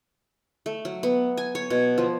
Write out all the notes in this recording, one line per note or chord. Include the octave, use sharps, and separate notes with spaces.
A3
F#3
B3
G#5
C#5
B2
F3